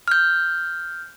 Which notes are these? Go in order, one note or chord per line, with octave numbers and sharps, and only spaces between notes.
F6 G6